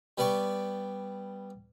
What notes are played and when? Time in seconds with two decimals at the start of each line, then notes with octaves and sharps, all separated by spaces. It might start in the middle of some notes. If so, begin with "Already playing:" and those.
0.18 G3 B3 D5 G5 C#6